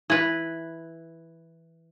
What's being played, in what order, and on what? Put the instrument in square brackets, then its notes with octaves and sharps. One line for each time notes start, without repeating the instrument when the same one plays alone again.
[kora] E3 B4